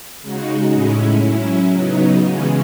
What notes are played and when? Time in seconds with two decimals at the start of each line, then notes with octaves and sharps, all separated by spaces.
0.22 C#3 G#3 D#4 F#4
0.73 A2 G#3 C#4 E4
1.23 F#3 C#4 E4
1.73 C#3 F#3 B3 D#4
2.24 C#3 E3 G#3 C#4